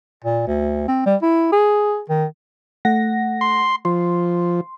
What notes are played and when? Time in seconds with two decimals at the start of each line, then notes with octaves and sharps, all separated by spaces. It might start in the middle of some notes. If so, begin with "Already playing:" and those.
0.24 A#2
0.47 D2
0.88 C4
1.06 G3
1.22 E4
1.52 G#4
2.09 D#3
2.85 A3 F#5 A#6
3.41 C6
3.85 F3 C6